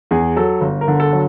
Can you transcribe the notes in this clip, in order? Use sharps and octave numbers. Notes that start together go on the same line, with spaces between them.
E2 G#4
F#3 A4
G1
A#4
D3
A4
F#3